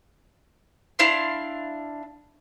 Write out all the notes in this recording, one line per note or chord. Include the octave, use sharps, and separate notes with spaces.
D4 E4 F5 C6